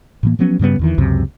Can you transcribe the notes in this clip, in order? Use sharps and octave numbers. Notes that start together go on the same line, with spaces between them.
A2 E3 A#3
F3 F#3 B3 C#4
G2 C#3 G3 B3
E2 D#3 E3
C#2 F#2 C3